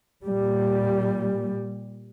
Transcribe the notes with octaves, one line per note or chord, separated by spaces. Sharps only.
A#2 G3